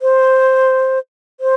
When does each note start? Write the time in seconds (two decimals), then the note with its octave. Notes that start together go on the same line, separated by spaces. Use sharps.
0.02 C5
1.40 C5